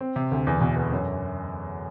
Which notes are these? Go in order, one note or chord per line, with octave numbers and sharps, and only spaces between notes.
C4
C3
D2
E2
B2
E2
F#2